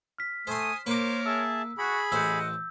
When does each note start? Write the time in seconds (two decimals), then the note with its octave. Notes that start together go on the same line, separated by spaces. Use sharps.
0.18 F6 B6
0.47 A3 C5 G#5 C6 D#6
0.86 A#3 A#4 C5 C#5 D6
1.26 G#4 E5 A5 E6
1.78 F#4 G#4 B5
2.12 A1 C5 D#5 F#5 E6 G6